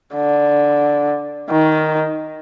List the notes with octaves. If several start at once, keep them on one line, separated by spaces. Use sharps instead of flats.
D3
D#3